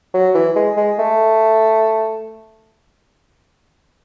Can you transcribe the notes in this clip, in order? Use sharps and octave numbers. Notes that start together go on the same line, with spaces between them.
F#3
E3
G#3
G#3
A3